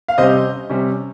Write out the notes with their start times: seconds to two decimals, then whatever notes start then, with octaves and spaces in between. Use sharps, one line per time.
0.08 F5
0.18 C3 G3 C#4 C5 D#5
0.69 C3 G3 C#4